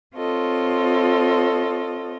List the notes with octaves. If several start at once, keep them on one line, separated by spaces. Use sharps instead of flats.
C4 F4 A4 C#5 D#5